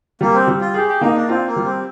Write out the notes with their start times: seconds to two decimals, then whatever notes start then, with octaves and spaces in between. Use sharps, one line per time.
0.21 G3 A#3
0.34 C4
0.48 G3
0.61 F4
0.74 G4 G#4
0.88 G4
1.01 A#3 D#4
1.15 D4
1.29 C4 F4
1.47 A#3
1.56 G3
1.65 C4